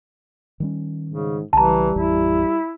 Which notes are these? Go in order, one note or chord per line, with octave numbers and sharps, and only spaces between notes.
D#3 G3 C#4
G#2 C#3
B1 C#3 E3 G3 A5 A#5
A1 F2 E3 E4